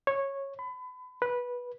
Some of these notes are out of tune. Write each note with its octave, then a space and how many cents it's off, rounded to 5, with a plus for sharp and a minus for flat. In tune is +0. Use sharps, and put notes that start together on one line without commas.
C#5 -10
B5 +30
B4 -15